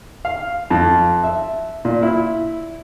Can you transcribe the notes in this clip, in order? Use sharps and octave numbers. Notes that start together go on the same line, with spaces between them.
F5
F2
E5
A#2
E4